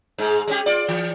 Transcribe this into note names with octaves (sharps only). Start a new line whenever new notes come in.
G#2 G#3
G#3 C#4 G4
F4 D5
E3